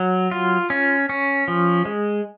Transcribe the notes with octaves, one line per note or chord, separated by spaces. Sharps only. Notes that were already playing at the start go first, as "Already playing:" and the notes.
Already playing: F#3
F4
C#4
C#4
F3
G#3